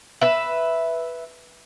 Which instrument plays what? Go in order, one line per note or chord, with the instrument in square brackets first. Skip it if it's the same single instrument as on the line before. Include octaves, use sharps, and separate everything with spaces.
[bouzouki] B4 E5